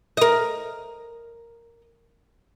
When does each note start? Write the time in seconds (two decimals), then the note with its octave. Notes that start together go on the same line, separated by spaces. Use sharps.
0.17 A#4 D#5